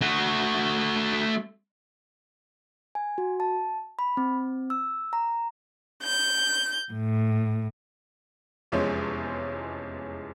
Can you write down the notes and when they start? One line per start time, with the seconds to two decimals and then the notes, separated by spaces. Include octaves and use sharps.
0.01 A3 F#4
2.95 G#5
3.18 F#4
3.40 A5
3.99 B5
4.17 C4
4.70 E6
5.13 A#5
6.03 G6
6.92 A2
8.72 F1 E2 F3 G#3 C#4 C#5